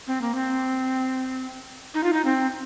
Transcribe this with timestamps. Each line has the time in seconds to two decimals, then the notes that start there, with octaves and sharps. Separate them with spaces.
0.07 C4
0.22 A#3
0.35 C4
1.94 D#4
2.04 F4
2.13 D#4
2.25 C4